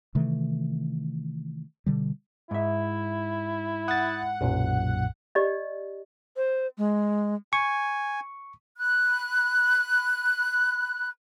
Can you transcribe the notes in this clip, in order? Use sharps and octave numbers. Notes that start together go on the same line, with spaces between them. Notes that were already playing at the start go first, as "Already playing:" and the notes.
C3 D#3 E3 A3
B2 D3 G3
G#2 E4 E5
F#5 D#6 A6
B1 F#2 A#2
G4 D5 D#5
C5
G#3
G#5 C#6
B5 F#6